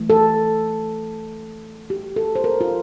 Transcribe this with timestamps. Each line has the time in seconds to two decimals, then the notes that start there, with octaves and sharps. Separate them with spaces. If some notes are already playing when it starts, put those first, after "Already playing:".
Already playing: E3 A3
0.10 A4
1.90 G4
2.16 A4
2.36 C5
2.44 A#4
2.61 F4